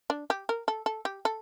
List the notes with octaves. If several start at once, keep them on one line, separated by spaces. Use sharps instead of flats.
D4
G4
A#4
A4
A4
G4
A4